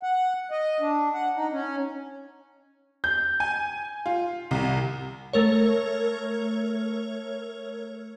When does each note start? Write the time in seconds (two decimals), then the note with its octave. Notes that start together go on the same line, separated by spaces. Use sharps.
0.03 F#5
0.51 D#5
0.80 D4
1.14 F#5
1.36 D#4
1.52 C#4
3.04 G6
3.40 G#5
4.06 F4
4.51 C2
5.33 A3 A#4 C#5